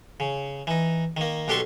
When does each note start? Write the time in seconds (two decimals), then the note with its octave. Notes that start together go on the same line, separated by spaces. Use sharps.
0.20 C#3
0.67 E3 D#4
1.17 D#3 A#3
1.48 B1 D4 G4 A4 C6 C#6